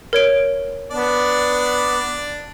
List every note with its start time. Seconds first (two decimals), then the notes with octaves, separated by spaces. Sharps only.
0.13 A#4 C#5 D7
0.91 B3 D4 D5